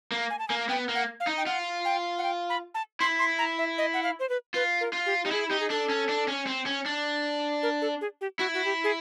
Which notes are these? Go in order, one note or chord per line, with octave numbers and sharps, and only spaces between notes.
A#3
G#5
A5
A#3 G#5
B3 G5
A#3
F#5
F5
D#4
G5
F4 F#5
G5
F#5
G5
B5
A5
E4 C6
C6
A#5
E5
D#5
F#5
F5
C5
B4
F4 B4
A#4
F4
G4
D#4 G4
E4 G#4
D#4 G4
G#4
D4 A4
C#4
D4
C#4
C4
C#4
D4
A#4
A4
G#4
G4
E4 F#4
F#4
G4
G#4